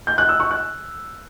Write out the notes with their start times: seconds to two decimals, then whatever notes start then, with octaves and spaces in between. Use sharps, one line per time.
0.07 G6
0.18 F#6
0.29 E6
0.40 C#6
0.51 F#6